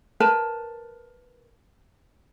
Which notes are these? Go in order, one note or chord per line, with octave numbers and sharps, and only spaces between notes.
A#4 B4 A5